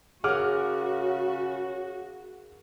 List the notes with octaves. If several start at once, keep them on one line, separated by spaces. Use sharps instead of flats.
C#3 F#4 G#4 A#4 F#5 D6 F6